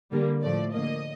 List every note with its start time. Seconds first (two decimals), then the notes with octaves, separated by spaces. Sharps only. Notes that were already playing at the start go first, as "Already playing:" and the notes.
0.12 D3 G3 A#3
0.42 A2 F3 A3 D5
0.73 D3 F3 A#3 D#5